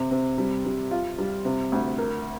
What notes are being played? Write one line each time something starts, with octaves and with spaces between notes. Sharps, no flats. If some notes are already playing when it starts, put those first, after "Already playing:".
Already playing: C3
C3
G3
G3
F4
G3
C3
D2
A#4